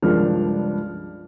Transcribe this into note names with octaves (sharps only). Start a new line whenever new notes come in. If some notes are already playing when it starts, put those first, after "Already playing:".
C#2 G2 F3 D4 A#4 F6